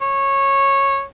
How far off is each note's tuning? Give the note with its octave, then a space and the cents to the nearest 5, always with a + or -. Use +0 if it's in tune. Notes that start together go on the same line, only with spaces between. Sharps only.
C#5 -15